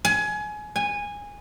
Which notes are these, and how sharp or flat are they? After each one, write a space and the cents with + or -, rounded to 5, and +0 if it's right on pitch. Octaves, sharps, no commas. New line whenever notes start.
G#5 +25
G#5 -15